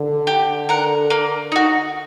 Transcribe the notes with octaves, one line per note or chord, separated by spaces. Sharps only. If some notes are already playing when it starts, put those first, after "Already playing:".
Already playing: D3
G4
A#4 F#5
A#3
D#4 F#4